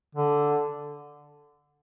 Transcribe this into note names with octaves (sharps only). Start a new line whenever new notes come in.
D3